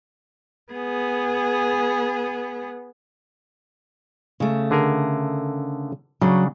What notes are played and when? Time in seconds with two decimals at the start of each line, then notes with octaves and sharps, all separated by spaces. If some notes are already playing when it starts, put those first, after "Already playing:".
0.73 B3 G#4
4.40 C#3 A3
4.71 D3 G#4 A#4
6.22 C#3 F#3 D4